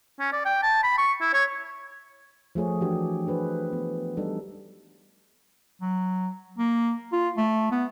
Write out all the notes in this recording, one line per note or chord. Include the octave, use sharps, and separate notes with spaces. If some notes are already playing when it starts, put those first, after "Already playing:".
C#4
D5
G5
A5
B5
C#6
E4
C#5
F3 A3 G#4 C#5
E3 D4 F#4 G4
D4 G#4 B4 C5
B3
G3 D4 D#4 A4
F#3
A#3
F4
A3
B3